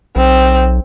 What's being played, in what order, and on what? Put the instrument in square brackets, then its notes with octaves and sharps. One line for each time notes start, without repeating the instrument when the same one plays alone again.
[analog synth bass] B1 [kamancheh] C4